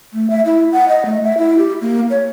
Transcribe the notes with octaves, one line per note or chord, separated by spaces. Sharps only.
A3
E5
E4
F#5
D#5
A3
E5
E4
G4
A#3
C#5